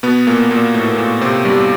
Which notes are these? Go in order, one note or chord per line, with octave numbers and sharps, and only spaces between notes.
B2 B3
A#2 A#3
A#2 A#3
A2 A3
A#2 A#3
C3 C4
G2 G3